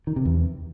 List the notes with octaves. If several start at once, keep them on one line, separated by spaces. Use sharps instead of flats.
D#3
C3
E2